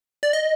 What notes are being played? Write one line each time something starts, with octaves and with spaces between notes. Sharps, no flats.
D5
D#5